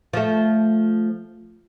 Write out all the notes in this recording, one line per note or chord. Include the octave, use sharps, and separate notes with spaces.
F3 A3